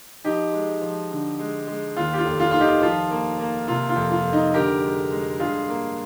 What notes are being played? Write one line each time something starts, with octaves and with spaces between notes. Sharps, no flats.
F3 D#4 G4
G#3
F3
D3
G#3
G#3
D#2 F4
G4
F4
F1
F4
D#3 F4
D#4 G4
F3 F4
A#3
A#3
C3 F4
F4
F2
F4
F1
D#4
D3 G4 A#4
G#3
G#3
G2 F4 G#4
A#3